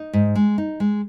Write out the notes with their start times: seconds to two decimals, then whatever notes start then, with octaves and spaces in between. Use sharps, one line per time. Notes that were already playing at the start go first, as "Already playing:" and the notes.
Already playing: D#4
0.13 G#2
0.35 G#3
0.58 D#4
0.80 G#3